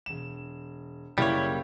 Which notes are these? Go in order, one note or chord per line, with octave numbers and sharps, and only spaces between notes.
E1 E7
F#1 G3 A#3 E4 C#5